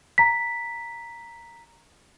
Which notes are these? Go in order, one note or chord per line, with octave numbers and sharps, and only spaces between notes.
A#5 B6